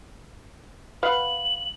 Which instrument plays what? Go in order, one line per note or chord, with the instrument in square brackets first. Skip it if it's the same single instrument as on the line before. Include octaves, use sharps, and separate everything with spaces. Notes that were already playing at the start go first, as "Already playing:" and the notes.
[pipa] B4 F5 F#5 [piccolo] F#7